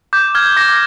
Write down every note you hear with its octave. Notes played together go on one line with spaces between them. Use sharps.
D6 G6
F6 G#6
D6 A#6